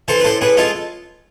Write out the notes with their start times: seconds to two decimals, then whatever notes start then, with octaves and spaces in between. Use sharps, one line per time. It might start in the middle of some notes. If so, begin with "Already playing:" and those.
0.08 E3 A4 C5
0.20 B4
0.24 A2 A4 C5
0.41 A2 G#4 B4
0.57 G#3 F4 A4